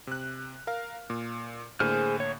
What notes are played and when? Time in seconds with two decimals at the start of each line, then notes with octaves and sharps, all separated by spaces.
0.07 C3 F#6
0.67 A#4 F5 F6
1.10 A#2
1.80 A2 D3 A#3 G#4 C5 F6
2.20 C#5